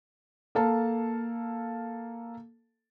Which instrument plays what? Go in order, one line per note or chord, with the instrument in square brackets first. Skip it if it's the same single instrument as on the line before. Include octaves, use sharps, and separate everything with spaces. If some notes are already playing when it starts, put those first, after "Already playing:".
[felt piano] A#3 A4 F5 A5